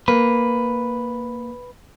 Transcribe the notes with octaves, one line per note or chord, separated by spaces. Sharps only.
A#3 B4